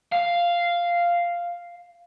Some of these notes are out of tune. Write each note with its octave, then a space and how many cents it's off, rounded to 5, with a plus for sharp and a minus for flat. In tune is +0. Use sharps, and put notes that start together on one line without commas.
F5 -5